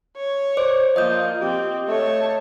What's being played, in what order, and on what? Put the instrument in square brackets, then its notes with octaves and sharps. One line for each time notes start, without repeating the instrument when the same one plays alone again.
[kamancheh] C#5
[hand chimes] C5 [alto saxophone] D5
[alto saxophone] F3 [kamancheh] A#3 F4 [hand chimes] D#5 D#6 G6
[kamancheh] C4 [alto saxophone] G4
[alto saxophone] A3 [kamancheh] C#5 A5